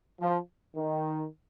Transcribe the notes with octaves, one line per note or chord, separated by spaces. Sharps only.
F3
D#3